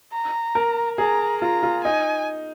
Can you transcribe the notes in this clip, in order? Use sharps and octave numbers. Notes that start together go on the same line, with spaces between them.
A#5
A#4
G#4 A#5
F4 A#5
F4
D#4 G#5